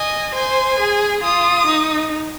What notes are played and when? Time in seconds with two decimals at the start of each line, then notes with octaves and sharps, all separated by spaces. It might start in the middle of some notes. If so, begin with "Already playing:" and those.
Already playing: D#5 G#5
0.35 C5 G#5
0.80 G#4
1.23 F4 D#6
1.67 D#4